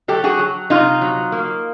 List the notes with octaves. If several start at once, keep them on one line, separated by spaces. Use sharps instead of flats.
F#3 G4 A4
F#4 G#4
F#3
C3 D#4 F4
F#3
A#3